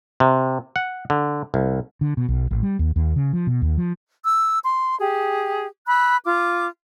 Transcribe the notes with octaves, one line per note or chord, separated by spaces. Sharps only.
C3
F#5
D3
C2
D3
B2
B1
A1
G3
D#2
D#2
C#3
F3
B2
D#2
F3
E6
C6
G4 G#4
B5 E6 F#6
F4 D6